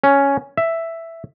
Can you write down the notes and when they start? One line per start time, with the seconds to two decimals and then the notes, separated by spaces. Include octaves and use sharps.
0.04 C#4
0.57 E5